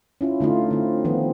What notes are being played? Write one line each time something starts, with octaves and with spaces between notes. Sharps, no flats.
C#4 E4 F4
D3 A3 D#4 F4
D3 C4
D#3 F3 B3 C4